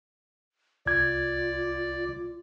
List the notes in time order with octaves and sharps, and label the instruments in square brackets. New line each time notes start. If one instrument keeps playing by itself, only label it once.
[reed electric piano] C2 G#6 [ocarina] F4 [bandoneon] D5